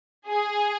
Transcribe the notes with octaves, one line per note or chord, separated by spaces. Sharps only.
G#4